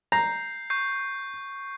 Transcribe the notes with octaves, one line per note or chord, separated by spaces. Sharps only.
A#5 G6 C7
C#6 G6 C7